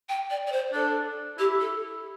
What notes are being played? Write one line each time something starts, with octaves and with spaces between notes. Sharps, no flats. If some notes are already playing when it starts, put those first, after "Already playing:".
G5
D5
D5
C5
D4 A4
E4 G4
A4